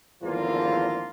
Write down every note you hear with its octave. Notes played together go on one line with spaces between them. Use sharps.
G#1 E2 D3 F3 A#3 F4